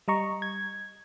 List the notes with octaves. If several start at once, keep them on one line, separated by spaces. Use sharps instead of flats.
G3 D#5 A#5 C#6
G#6